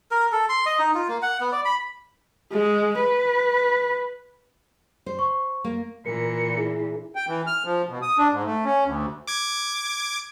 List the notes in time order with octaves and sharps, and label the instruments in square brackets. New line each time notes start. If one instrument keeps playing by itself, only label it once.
[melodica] A#4
A4
C6
D#5
D#4
F4
A#3
F#5
B3
D5
B5
[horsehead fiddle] G#3
B4
[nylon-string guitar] C5
[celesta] C#6
[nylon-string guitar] A#3
[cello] A#2 E3 [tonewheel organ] A#4 [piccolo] C#7
[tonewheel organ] E4 G#4
[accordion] G5
E3
F6
F3
B2
D#6
D4
G#2
A3
C#4
D2
[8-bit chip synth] D6 G#6